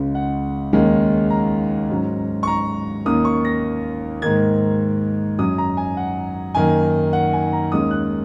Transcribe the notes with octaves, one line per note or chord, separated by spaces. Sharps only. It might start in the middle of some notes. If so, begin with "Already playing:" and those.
Already playing: C#2 C#3 G#3 C#4
F#5
D#2 D#3 G#3 C#4
A#5
G#2 F#3 C#4
C#6
A#5
D#2 D#3 A#3 C#4 D#6
C#6
A#6
G#2 D#3 A#3 G#6
F#2 F#3 C#4 D#6
A#5
G#5
F#5
F#2 D#3 A#3 G#5
F#5
G#5
A#5
D#2 D#3 G#3 C#4 D#6
F#6